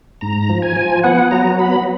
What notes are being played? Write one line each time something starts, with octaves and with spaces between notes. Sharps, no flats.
G#2 A#5
F3
G#5
F3
B3 F#5
F#3 A#5
B3 B5